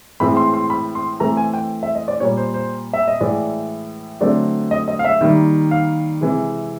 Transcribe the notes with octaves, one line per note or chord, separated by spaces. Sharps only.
A2 E3 G#3 C4 B5
C6
C6
B5
C6
E3 A3 C4 A#5
G#5
G5
E5
D#5
D5
A#2 G3 A#3 C#5
C5
C5
E5
D#5
A2 E3 G#3 D5
D3 F#3 A3 C4 D5
D#5
D#5
F5
E5
D#3 G3 A#3
F5
C3 E3 G#3